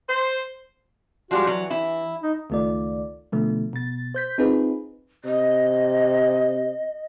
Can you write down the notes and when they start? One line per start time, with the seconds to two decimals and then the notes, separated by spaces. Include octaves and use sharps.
0.08 C5
1.31 F3 G3 G#3 F#4
1.47 E3 F#3
1.71 E4
2.23 D#4
2.50 C#2 D#3 A3 F4 D5
3.32 B2 D3 F3 A3
3.73 B2 A6
4.14 C5 G6 B6
4.38 C4 D#4 F4 G#4 B4
5.24 C3 D#5